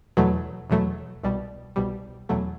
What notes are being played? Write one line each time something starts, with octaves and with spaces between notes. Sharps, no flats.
E2 B2 F#3 A3
E2 B2 F#3 A3
C2 B2 G3
C2 B2 G3
E2 B2 F#3 A3